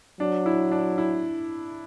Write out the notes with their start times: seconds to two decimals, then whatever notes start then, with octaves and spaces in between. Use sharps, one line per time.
0.20 F#3 D4
0.46 E4
0.71 D4
0.98 E4